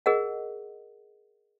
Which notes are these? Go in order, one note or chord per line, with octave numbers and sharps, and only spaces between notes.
G#4 A#4 D#5 F#5